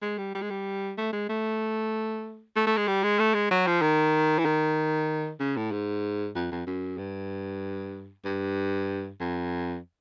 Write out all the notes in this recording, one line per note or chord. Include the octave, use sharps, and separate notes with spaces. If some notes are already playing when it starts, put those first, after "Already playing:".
G#3
G3
G3
G#3
G3
A3
G#3
A3
A3
A3
G#3
G3
G#3
A3
G#3
F#3
F3
D#3
E3
D#3
C#3
A2
G#2
F2
F2
F#2
G2
G2
F2